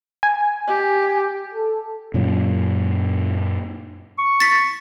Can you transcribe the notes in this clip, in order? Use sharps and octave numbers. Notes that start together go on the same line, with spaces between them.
G#5
G4
A4
F#2 A#2 F#3 A#3
C#6
A6 B6